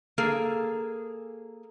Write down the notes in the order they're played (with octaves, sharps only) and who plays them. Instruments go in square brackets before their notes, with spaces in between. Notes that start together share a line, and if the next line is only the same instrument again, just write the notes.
[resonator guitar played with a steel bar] A#3 G#4 A4